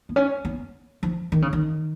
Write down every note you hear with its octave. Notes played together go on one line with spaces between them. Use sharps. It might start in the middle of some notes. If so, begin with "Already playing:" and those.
B3
C#4
B3
F3
D#3
C#3
D#3